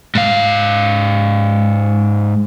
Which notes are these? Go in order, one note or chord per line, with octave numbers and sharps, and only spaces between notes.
G#2 F5